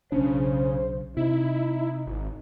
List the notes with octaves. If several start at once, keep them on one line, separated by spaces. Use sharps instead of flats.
B1 C#3 C#4 D4 C5
C3 D#4 E4
G#1